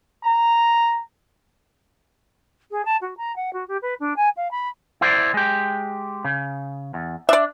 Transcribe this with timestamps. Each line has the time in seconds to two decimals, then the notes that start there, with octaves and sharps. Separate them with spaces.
0.24 A#5
2.71 G#4
2.85 A5
3.02 F#4
3.17 A#5
3.36 F#5
3.53 F#4
3.68 G4
3.82 B4
4.00 D4
4.16 G#5
4.37 F5
4.51 B5
5.01 E4 C5 D5
5.34 G#3 G4
6.25 C#3
6.94 E2
7.29 D4 D5 E5